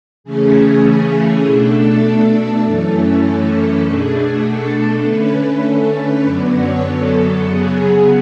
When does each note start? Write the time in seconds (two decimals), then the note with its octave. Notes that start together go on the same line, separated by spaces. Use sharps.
0.24 C#3 E3 A3 C#4 G#4
1.44 B2 A3 D4 A4
1.74 A4
2.64 F#2 E3 A3 C#4 A4
3.84 B2 A3 D4 G#4
4.13 G#4
4.44 A4
4.74 A4
5.04 D3 A3 C#4 B4
5.64 A4
5.94 B4
6.24 F#2 D3 F#3 B3 D5
6.54 C#5
6.85 A4
7.44 C#3 F#3 B3 G#4